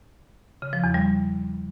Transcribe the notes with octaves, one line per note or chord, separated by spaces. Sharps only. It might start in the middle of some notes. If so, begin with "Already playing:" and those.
C#3
F3
E2
G3